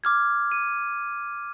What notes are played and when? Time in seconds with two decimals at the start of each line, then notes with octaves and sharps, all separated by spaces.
0.04 D6 F6 G#6
0.52 D#7